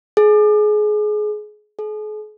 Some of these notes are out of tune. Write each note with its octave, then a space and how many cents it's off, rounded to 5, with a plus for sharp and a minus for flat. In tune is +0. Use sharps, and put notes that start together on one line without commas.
G#4 +25
G#4 +45